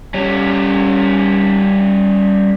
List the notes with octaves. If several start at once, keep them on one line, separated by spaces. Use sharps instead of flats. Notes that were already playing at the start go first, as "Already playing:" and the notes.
G3 C#4